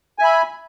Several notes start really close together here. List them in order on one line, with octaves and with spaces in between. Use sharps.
G#5 E5 B5